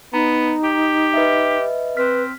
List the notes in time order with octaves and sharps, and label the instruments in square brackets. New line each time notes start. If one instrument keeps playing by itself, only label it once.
[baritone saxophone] B3 [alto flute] D#4 [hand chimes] A#5
[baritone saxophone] G4
[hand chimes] B4 D#5 E5
[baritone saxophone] C4 [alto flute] B4 [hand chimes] F6 B6